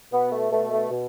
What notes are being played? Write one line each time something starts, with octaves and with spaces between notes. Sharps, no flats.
B2 B3
A3
B2 A3
A3
B2